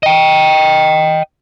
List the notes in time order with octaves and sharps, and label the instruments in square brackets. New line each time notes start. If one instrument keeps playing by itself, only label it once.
[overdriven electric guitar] D#5 G5